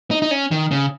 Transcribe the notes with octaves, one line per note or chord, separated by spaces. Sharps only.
D#4
D#4
C#4
D#3
C#3